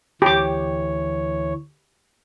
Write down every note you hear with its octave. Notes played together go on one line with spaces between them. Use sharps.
D2 E3 G4 C#5 D6